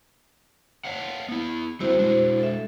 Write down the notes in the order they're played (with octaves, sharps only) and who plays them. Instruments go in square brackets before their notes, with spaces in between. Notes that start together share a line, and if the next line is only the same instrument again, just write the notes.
[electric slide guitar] C#5 F5 F#5
B3 E4
[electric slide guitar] G3 A3 C4 [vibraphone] E4 F#4 C5
[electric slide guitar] G#3 D4
[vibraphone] A4 E5